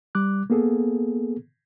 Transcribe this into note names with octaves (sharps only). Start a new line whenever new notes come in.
G3 D6 F#6
A#3 B3 G#4 A4